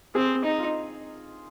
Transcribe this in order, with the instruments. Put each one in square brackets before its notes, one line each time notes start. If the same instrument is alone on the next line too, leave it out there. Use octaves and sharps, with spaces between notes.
[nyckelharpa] C4 [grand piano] G#4
[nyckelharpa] D#4
[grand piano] F4